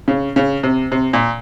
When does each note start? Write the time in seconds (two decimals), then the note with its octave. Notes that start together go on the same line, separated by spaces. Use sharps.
0.08 C#3
0.36 C#3
0.63 C3
0.92 C3
1.13 A#2